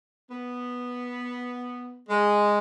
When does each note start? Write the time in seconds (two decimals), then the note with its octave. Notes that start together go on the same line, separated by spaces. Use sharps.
0.31 B3
2.10 G#3